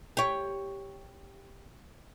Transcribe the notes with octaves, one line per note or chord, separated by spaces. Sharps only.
G4 C#5